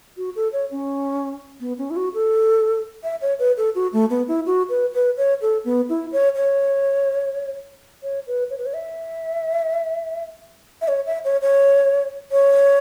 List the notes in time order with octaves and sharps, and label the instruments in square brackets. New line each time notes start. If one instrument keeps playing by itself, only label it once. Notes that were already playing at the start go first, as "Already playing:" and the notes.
[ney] F#4
A4
C#5
C#4
B3
C#4
E4
F#4
A4
E5
C#5
B4
A4
F#4
A3
B3
E4
F#4
B4
B4
C#5
A4
B3
E4
C#5
C#5
C#5
B4
C#5
B4
C#5
E5
E5
C#5
E5
C#5
C#5
C#5